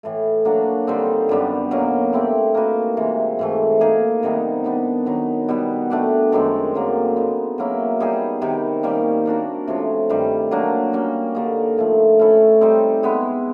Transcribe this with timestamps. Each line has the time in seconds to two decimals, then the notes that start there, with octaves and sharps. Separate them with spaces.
0.03 A2 E3 A3
0.45 F#3 A#3 D4 F#4
0.87 D3 G3 C4 D#4
1.29 F#2 D3 G3 B3
1.71 B2 F#3 A#3 C#4
2.13 A3 C4 E4 G4
2.55 A#3 D#4 F#4 B4
2.97 C3 E3 G#3
3.39 G#2 E3 A3
3.81 A#3 D#4 G#4
4.23 C3 D#3 G3 B3
4.64 D#3 G3 B3 D4
5.06 D#3 F#3 B3 D#4
5.48 B2 G3 B3
5.90 A3 D4 G4
6.32 F#2 D#3 G#3 C4
6.74 D3 F#3 A#3
7.16 G#3 B3 D#4
7.58 F#3 A#3 C#4 E4
8.00 G3 B3 D#4 G#4
8.41 C3 D#3 G3
8.83 D#3 G3 A#3 C#4
9.26 A#3 D4 F#4 A#4
9.68 C3 F3 A3 C#4
10.09 G2 D#3 G3
10.51 F#3 A#3 D4
10.93 G3 A#3 C#4
11.35 D3 G3 A#3 D#4
11.77 A2 F3 A3
12.19 A3 C#4 E4 A4
12.61 G3 C4 D#4
13.03 G#3 B3 E4